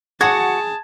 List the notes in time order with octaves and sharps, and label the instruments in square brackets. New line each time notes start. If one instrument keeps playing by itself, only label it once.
[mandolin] F#4 [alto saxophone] G#4 [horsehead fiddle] A5 [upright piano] G#6